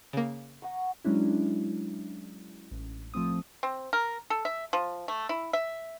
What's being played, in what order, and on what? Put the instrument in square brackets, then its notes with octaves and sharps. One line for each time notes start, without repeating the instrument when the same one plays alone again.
[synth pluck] C#3 A#3
[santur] F#5 A#5 C#6
[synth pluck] F#3 G#3 C#4 D4 E4
A1
F3 A3 C4 D#6
[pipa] C4
A#4
A4
E5
F3
A3
E4
E5